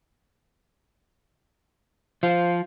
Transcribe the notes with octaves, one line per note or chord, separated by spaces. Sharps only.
F3 C5 F5